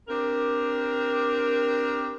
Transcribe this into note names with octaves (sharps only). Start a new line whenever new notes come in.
C4 D4 G4 A#4